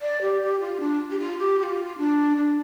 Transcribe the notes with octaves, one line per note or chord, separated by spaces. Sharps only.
D5
G4
G4
F4
D4
G4
F4
G4
G4
F4
D4
D4